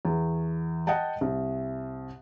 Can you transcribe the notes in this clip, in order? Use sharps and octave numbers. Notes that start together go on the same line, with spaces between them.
E2
D#5 F#5 G5 A5
C2